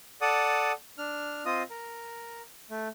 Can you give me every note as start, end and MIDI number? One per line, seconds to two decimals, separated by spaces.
0.21 0.72 69
0.21 0.72 74
0.21 0.72 78
0.21 0.72 87
0.98 1.43 62
0.98 1.43 89
1.45 1.63 60
1.45 1.63 65
1.45 1.63 75
1.45 1.63 87
1.70 2.42 70
2.70 2.88 57